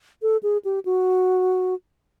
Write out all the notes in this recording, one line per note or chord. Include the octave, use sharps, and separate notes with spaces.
A4
G#4
G4
F#4